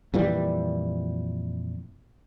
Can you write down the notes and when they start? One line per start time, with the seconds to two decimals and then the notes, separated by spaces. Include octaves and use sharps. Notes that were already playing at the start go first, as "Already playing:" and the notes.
0.14 F2 A#2 E3 G3